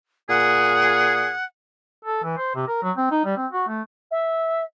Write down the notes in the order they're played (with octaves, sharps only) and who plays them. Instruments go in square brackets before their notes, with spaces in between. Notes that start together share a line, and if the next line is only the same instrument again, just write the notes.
[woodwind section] A#2 G#4 [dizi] F#5
[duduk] A4
E3
C5
C3
A#4
F#3
C4
D#4
G3
C4
F#4
A3
[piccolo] E5